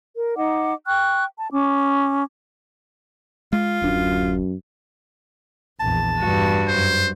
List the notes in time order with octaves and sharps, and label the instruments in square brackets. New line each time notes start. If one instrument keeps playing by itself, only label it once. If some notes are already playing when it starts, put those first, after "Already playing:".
[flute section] A#4
D#4 D#5 F#5 D6
G5 C#6 F6 F#6
A5
C#4 D6
[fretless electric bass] G#3 [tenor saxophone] F4
[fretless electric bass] D1 D4 [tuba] F#2
[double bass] A#1 E2 [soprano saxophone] A5
[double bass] E2 [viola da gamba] G2 F#4
[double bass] F#2 [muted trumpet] C5